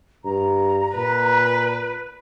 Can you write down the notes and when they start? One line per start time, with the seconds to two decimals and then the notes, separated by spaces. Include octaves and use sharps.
0.25 G2 A#5
0.95 A#2 B4